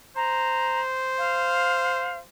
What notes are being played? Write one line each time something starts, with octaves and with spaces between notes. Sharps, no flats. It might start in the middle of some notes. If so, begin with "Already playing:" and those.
C5 A#5
F5